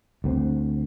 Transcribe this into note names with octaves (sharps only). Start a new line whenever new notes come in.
D2 B3 C4